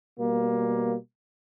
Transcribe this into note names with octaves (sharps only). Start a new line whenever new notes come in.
B2 G3 A#3